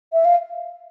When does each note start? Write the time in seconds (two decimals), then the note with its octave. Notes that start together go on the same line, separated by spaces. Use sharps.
0.13 E5
0.25 F5